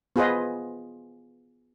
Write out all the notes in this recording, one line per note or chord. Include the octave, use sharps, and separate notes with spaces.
B3 F4 G#4 B4 C5 D#5